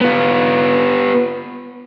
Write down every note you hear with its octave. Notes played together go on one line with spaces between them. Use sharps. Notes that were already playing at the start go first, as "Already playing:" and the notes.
B3 F4